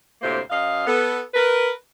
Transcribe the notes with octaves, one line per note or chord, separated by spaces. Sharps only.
D2 A2 C3 A#3 C5
F#2 D#5 F5
B3 A4
A#4 B4